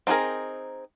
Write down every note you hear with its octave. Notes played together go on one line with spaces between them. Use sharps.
C4 D#4 F#4 G#4 A#4